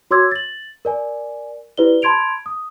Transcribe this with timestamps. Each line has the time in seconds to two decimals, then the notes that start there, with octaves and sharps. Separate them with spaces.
0.11 F#4 C#5 C6 D6 E6 G#6
0.31 A6 F#7
0.85 A#4 D5 G#5
1.77 E4 G4 B4 C5 D5 G7
2.02 A5 B5 C6 G#6 D7 F7
2.46 D#6